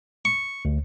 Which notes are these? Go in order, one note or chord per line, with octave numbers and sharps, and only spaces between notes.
C#6
D2